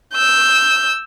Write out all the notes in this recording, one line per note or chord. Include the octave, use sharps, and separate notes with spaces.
E6 G6